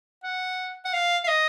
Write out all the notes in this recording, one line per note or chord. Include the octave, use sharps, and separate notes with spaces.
F#5
F#5
F5
F5
D#5